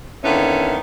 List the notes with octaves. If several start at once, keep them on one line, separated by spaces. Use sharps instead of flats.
D3 D#3 A#3 B3 C#4 E4